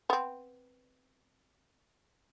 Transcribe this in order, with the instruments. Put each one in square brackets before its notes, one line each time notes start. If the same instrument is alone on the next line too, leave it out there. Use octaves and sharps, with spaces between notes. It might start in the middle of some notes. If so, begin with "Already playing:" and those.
[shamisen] B3 C4